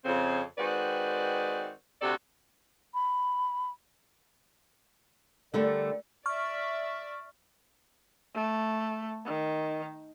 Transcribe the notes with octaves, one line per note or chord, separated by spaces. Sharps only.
F2 C#3 C4
D#3 G#3 C4 F#4 B4 D5
D2 C3 F#4 G4 A4 D5
B5
D3 G3 A3 A#4 D5
D5 E5 C#6 F6
A3
D#3